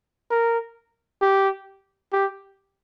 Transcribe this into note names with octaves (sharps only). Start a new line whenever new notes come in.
A#4
G4
G4